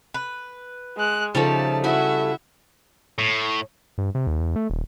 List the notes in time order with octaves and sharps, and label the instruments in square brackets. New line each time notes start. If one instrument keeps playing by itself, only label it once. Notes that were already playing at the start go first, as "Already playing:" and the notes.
[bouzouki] B4
[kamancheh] G#3 F#6
[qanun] C#3 F3 D#4 [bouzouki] G3 A3 [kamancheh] A5
[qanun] E4 G#5 B5 [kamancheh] F#4 E5
[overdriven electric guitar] A2
[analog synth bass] G2
C3
D#2
E2
A3
D#1